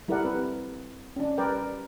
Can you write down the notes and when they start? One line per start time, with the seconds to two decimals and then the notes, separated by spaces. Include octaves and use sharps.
0.08 G3 E4 A4 A#4 D5 F#5
0.25 C4 B4
1.16 C#4 D4
1.38 G3 A#4 B4 D5 G5